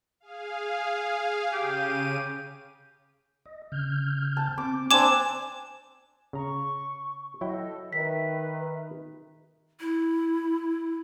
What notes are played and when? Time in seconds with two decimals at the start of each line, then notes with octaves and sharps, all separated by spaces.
0.20 G#4 F5
1.53 C#3 G4 D#7
3.46 D#5
3.72 C#3 F6 G6
4.37 A5
4.58 C4 D6
4.91 C4 D4 G#5 D6 E7
6.33 C#3 A#5 C#6
7.41 F#3 E4 A4 D#5 G5
7.93 D#3 B4 E5 B6
9.80 E4